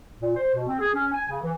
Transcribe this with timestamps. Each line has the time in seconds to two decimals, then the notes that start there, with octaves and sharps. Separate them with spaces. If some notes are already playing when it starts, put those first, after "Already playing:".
0.21 A#2
0.36 C5
0.54 B2
0.67 C4
0.80 G#4
0.94 C#4
1.13 G#5
1.29 C#3
1.42 E3